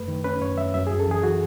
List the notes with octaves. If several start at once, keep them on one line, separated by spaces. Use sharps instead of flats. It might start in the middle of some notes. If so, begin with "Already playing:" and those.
Already playing: F#2 A3 B4
D#3
C#4 B4
F#2 C#5
F#2 E5
F#2 E5
G#4
F#2
A4
E3 G#4
F#4